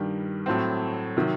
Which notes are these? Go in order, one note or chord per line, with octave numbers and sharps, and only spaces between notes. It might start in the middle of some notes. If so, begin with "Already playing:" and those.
Already playing: G2 D#3 G3
A2 F#3 A3 C4
C3 D#3 F#3